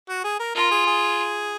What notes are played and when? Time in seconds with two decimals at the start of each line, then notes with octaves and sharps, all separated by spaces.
0.09 F#4
0.24 G#4
0.40 A#4
0.55 F4 A#4
0.71 G#4
0.87 G#4